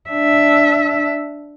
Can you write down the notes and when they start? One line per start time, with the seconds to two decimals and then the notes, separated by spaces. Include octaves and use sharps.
0.10 D4 E5